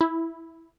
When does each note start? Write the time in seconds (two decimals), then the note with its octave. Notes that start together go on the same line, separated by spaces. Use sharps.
0.01 E4